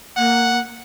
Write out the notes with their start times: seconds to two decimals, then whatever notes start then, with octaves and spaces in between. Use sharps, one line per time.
0.17 A#3 F#5